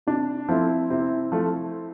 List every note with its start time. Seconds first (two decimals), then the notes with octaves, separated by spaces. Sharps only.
0.07 C3 D4
0.49 F3 A3 C4 E4
0.90 C3 C4 E4
1.32 F3 A3